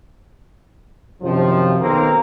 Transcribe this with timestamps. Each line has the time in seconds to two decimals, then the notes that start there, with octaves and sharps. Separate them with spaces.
1.22 F#2 C3 D#3 F3
1.80 B1 D#3 A#3 C4 F5 A#5